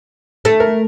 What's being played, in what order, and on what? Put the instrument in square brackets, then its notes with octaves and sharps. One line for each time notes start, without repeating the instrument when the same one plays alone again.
[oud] A3 [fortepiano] A4
[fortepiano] A#4